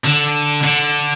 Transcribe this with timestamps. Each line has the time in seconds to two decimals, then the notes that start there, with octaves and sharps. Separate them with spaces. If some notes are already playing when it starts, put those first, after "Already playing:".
0.05 D3
0.63 D3